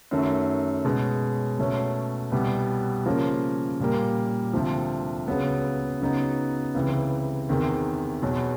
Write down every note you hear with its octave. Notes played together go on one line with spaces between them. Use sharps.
F#2 D#3 F#3 A3
B2 G#3 C#4
B2 F#3 A3 C#4
C2 B2 G3 B3
C#3 F3 A#3 C#4
A#2 G3 A#3
D2 C3 F3
C#2 C#3 F#3 B3
C#3 F#3 B3 D#4
C#2 C3 E3
E2 C3 D#3
E2 B2 F#3